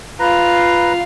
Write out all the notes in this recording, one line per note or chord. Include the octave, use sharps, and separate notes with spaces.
F4 B4 F5 A#5